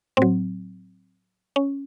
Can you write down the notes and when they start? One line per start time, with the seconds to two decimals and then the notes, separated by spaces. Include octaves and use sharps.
0.17 A2 F#3 C4
1.56 C#4